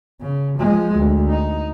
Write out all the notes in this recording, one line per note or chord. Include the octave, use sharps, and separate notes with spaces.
C#3
F3 G#3
D2
D#4